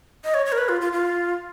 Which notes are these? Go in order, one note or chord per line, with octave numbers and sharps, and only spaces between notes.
D#5
C#5
C#5
A#4
B4
F4
F4
F4